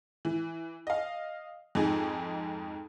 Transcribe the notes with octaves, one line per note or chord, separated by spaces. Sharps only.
E3
D#5 F5
F2 G#2 D#4 G#4